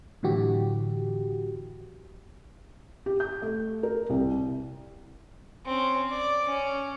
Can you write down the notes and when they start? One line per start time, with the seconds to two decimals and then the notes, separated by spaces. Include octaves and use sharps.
0.23 A2 D3 E3 F#3 F#4 G4
3.06 G4
3.20 G6
3.42 A3
3.83 A#4
4.10 C2
5.66 C4 C#4
6.10 D5
6.47 C#4